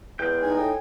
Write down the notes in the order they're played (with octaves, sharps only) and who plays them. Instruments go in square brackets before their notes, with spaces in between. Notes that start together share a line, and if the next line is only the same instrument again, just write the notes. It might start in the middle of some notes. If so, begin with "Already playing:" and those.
[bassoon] E2 [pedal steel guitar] G#3 G5 G6
[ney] D#4 [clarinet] G#5
[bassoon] A2 [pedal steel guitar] G5